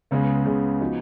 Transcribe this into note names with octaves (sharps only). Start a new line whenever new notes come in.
C#2 C#3 G#3 B3
C#2 C#3 G#3 B3
F3 B3 D#4 F#4